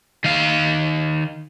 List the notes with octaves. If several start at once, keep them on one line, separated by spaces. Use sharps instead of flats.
D#3 F5